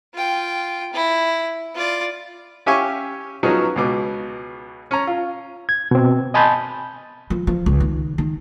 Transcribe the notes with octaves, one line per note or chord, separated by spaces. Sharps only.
F4 G5
E4
F4 D5
C#4 G4 E5 F5 G#5 C#6
F3 F#3 B3 C#4 D#4 G#4
C#2 B2 D6
C#4 A#5
F4
G#6
B2 C4
D#5 G#5 A5 B5 C6 G6
F3
F3
C#2
D#3
D#3